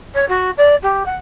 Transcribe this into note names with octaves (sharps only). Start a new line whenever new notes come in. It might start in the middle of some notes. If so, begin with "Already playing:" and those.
C#5
F#4
D5
G4
F#5